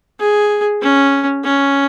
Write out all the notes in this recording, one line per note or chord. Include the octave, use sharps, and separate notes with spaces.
G#4
C#4
C#4